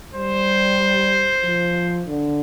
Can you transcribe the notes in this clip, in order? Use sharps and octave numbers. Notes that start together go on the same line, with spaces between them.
G3 C5
F3
D3